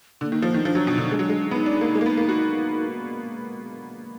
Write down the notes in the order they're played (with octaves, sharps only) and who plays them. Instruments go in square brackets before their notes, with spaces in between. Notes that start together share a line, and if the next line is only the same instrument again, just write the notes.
[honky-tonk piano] D3 [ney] A#3
[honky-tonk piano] D#3
F3
D#3
[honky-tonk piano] F3 [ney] D4
[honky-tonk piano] F#3
B2
D3
G#3
F#3
G#3
[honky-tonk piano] B3 [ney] D#4
[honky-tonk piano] D4
A#3
G#3
A#3
B3
A#3
F#4